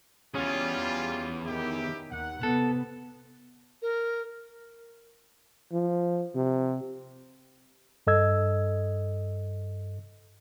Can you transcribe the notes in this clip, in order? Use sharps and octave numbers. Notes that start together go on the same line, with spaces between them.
E2 G3 C#4 F4 G#4
D#3 E4 G4
D#2 F#5
C3 B3 A4
A#4
F3
C3
G2 A4 D#5 E6 G#6